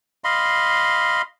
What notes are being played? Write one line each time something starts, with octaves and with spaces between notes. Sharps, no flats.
D#5 F5 B5 C6